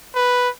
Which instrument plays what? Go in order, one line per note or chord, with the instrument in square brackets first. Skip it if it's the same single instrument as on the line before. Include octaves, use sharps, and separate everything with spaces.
[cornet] B4